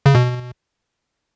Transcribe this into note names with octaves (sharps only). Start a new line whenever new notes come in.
C#3
B2